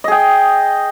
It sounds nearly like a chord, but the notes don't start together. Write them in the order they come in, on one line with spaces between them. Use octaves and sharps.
D#5 G#4 G5